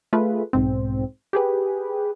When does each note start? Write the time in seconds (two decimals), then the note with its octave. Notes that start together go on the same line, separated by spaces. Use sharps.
0.13 A3 F4 G#4 B4
0.53 B1 G#2 C4
1.33 G4 G#4 B4